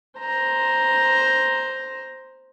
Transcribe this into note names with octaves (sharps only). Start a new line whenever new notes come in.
C5 A#5